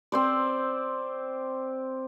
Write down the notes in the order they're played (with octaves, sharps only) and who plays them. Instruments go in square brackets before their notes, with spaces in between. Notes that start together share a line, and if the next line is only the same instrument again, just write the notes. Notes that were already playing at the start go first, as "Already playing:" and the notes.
[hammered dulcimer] C4 C5 D5